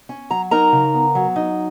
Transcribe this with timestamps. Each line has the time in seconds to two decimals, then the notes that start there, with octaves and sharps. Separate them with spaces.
0.09 C#4
0.30 F#3 A#5
0.51 D#4 A#4 A#5
0.72 C#3
0.94 B3
1.15 F#3
1.36 D#4